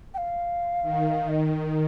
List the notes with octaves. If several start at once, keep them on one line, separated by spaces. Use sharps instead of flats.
G5
F5
D#3
D#5